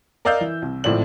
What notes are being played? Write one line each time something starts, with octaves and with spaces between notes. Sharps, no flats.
A#4 D5 D#5 F5 E6 G6
E3
C2
G#1 A2 F3 C4 D5 F#7